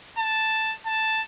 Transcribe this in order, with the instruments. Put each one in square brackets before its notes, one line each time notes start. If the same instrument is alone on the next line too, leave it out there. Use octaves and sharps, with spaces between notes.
[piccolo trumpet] A5
A5